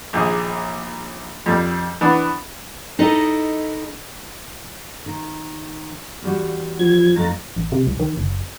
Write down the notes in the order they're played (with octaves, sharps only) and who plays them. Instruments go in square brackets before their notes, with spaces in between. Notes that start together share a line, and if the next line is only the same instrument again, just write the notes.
[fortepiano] A#1 D#2 G#4
F2 G3
E3 B3 D4
[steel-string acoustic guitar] D#4 E4 A4 D#5
[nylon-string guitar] D#3
E2 G3 F#4
[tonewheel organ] F3 G#6
[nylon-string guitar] F2 A3 D#4 [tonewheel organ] A#5 A6
[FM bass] A1
C3
C2
D#3
F#1